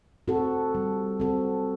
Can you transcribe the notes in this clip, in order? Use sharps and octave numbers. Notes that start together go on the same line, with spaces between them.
C4 F#4 A4
G3
C4 F#4 A4